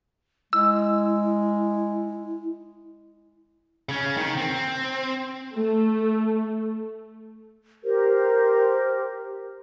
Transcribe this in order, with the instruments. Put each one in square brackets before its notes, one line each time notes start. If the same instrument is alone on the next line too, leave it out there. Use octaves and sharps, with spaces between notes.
[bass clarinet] G#3 [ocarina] E4 [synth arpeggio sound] E6
[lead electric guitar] C#3 C#4
D#3
C4
[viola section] A3
[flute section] G4 A#4 C5